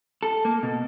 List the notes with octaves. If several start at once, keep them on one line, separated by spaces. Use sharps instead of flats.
A4
A#3
B2